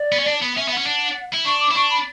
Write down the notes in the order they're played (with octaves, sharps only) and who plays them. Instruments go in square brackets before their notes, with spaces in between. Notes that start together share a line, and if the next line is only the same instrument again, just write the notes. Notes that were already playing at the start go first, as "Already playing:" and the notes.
Already playing: [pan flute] D5
[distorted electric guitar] B3
C#4
D4
B3
[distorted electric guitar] C#4 [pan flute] E5
[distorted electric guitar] B3 [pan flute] F#5
[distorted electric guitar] C#4
D4
E4
[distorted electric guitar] D4 [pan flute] C#6
[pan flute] D6
[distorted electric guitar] E4
[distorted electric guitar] D4 [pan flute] C#6
[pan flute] B5